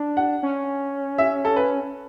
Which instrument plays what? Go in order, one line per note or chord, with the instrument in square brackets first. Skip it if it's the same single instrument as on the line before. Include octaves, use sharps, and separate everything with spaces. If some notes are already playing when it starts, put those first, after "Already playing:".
Already playing: [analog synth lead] D4
[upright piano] F#5
[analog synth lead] C#4
[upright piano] E5
A4
B4